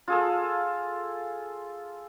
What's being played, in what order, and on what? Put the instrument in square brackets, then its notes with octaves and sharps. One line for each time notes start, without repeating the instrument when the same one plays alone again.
[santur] F4 G#4 A4